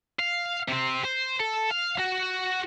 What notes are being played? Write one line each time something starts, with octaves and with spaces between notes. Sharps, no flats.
F5
C3 C4
C5
A4
F5
F#4